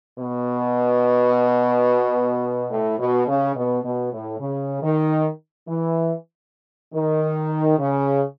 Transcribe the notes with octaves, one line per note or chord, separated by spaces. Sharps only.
B2
A2
B2
C#3
B2
B2
A2
C#3
D#3
E3
D#3
C#3